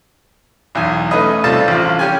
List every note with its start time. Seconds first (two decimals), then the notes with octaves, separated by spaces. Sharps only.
0.75 B1 E2 G#5
1.11 A3 C#4 D#4 B4 D#5
1.44 C3 G3 F4 A4 A5
1.68 A1 F3 F5
1.99 C#4 G4 G#5